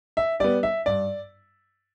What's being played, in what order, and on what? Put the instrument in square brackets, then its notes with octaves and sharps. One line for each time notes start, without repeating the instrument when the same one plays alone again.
[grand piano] E5
G3 B3 D5
E5
G2 D5